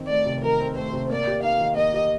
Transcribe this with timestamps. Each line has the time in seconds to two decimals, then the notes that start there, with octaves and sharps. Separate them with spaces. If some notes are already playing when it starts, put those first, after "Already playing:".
Already playing: D#3 C4
0.10 A3 D5
0.26 C3
0.43 D#3 A#4
0.60 C4
0.77 A3 C5
0.93 C3
1.10 A#3 D5
1.27 G4
1.43 D#4 F5
1.61 D#3
1.76 A#3 D#5
1.93 G4